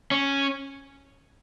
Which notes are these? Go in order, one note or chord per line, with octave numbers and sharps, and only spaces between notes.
C#4